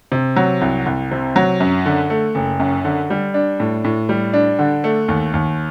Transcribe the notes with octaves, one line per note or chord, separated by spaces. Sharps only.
C3
F#3
C2
C2
C3
F#3
F#2
D3
A3
F#1
F#2
D3
G3
D4
A2
A2
G3
D4
D3
A3
D#2
D#2